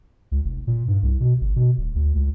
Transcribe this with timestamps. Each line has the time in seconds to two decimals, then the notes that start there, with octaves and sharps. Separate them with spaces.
0.32 C#2
0.45 F1
0.67 A#2
0.88 G2
1.03 C2
1.20 B2
1.41 G1
1.56 B2
1.78 D#1
1.95 D2
2.15 C#2